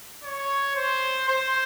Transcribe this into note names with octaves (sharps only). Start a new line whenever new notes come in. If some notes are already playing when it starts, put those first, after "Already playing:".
C#5
C5
C5